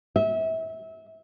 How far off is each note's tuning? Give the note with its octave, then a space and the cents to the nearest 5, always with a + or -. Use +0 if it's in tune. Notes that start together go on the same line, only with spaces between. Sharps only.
E5 -30